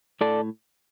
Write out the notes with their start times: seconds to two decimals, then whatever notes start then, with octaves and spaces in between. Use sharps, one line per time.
0.21 A2 A4 D5